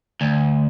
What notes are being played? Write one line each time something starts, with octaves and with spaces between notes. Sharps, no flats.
D2